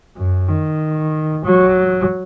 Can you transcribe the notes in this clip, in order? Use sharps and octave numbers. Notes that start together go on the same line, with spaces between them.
F#2
D#3
F#3